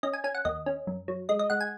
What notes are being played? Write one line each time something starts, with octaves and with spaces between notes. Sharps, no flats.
C#4 D#5
G#5
C#4 G#5
F#5
D#2 D#5
C#4
F#2
F#3
G#3 D#5
D#5
G#3 F#5
G#5